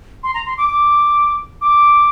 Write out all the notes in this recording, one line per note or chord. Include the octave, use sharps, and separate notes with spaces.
C6
A#5
C6
D6
D6
D6